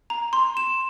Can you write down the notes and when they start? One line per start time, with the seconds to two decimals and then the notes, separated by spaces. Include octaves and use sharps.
0.10 A#5
0.33 C6
0.57 E7